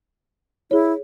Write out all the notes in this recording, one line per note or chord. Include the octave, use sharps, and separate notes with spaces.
E4 G#4 C#5